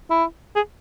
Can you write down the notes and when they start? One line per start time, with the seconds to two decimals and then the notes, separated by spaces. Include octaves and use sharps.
0.10 E4
0.55 G#4